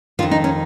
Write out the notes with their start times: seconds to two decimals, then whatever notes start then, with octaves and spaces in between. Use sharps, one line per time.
0.19 D#3 F4
0.22 F2
0.31 D#4
0.44 C#4